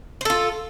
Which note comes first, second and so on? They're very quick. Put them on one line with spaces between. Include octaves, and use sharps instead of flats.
C5 A4 F4